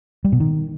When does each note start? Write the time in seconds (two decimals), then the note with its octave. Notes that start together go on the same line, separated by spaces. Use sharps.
0.25 G3
0.32 B2
0.40 D#3